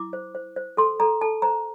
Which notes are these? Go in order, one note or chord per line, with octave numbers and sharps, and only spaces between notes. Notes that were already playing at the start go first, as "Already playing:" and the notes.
Already playing: E4 D6
C5
C5
C5
A4 C6
A4 A#5
A4 A5
C5 A#5